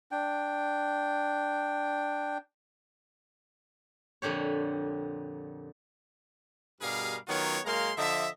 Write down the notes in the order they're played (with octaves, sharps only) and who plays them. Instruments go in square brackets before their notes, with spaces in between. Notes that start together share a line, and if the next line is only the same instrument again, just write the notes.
[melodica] D4 G5
[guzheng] F2 A#2 D3 G4 C#5
[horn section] G2 B2 G3 G#4 A#4 F5
D#3 F#3 B3 C#4 F4 C#5
F#2 G#3 A#3 F5 A#5 C6
D3 F3 D#5 E5